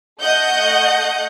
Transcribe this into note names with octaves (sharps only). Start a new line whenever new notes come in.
A3 D#5 F#5 G6